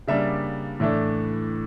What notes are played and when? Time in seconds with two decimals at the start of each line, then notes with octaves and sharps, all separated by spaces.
0.08 C#3 G3 A#3 D4 E5
0.80 A2 E3 A3 D4